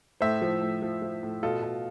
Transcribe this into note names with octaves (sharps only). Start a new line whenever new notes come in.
A2 C5 E5
F3
A2
F3
F3
A2
B2 F4 A4
B2